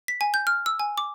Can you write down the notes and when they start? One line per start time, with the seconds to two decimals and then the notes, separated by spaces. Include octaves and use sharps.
0.08 B6
0.21 G#5
0.34 G6
0.47 F6
0.66 E6
0.79 G#5
0.98 D6